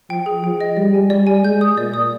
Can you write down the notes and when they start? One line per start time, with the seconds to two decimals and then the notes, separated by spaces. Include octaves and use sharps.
0.10 F3 G5
0.26 G#4
0.43 F3 G5
0.61 D#5
0.77 G3 D5
0.94 G#5
1.10 G3 D5
1.27 G#5
1.44 G#3 G6
1.61 D#6
1.77 A#2 D5
1.94 D#6